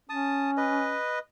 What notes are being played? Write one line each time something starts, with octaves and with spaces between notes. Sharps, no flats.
C#4 A5 D#6
B4 D#5